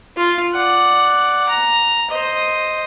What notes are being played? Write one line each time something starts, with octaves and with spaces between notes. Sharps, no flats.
F4
D5 F#5
A#5
C5 D#5